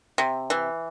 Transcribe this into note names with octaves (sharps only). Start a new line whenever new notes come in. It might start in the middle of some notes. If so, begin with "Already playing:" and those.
C3
E3